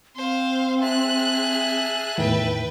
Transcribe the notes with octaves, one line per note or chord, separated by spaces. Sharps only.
C4 C5 F5
G#4 E5 A5 F#6
E2 A2 D#3 B4 G5